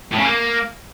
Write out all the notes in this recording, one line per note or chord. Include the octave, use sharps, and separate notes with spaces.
A2
C#3
A#3